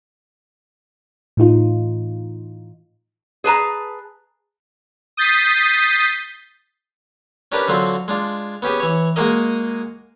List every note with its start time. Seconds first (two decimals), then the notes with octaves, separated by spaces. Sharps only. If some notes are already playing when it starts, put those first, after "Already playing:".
1.37 A2 E3 D#4 F4
3.44 G#4 B4 A5 A#5
5.17 D#6 G6 A6 B6 C7
7.52 C#4 D4 G4 A#4 B4
7.68 D3 F#3 C4 F4
8.08 G#3 D4 F4
8.62 B3 C#4 G4 G#4
8.80 E3 C#5
9.16 G#3 A#3 F#4 G#4 A#4 D#5